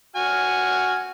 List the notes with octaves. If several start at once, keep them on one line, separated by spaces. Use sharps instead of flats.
F#4 G#5 F6